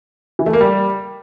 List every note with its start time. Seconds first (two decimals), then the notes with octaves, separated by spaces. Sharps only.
0.39 E3
0.46 A3
0.53 A#3
0.61 G3